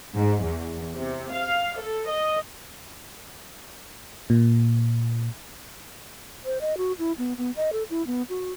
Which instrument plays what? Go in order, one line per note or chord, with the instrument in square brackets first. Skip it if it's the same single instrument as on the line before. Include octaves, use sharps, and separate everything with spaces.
[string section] G#2
E2
C3
F5
A4
D#5
[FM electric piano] A#2
[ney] C5
D#5
F#4
E4
B3
B3
D#5
A4
E4
B3
F#4